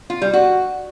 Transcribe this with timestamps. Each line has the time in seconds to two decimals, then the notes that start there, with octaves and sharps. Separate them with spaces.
0.10 F4
0.22 G3
0.33 F#4